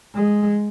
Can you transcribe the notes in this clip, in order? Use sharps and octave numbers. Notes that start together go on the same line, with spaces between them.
G#3